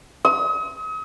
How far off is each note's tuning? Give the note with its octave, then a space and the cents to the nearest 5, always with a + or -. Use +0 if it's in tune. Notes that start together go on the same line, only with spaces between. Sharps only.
D#6 +40